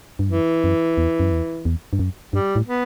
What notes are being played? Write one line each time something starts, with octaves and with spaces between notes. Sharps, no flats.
G2
F#2 E3
F#2
E2
F#2
E2
E2
G2
F#2
G2 G3
A2
B3